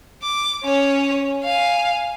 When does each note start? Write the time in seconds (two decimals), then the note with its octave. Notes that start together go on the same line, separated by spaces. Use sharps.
0.23 D6
0.64 C#4 C#5
1.44 F5 G#5